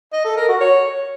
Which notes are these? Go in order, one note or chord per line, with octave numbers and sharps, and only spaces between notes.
D#5
A4
A#4
F#4
C#5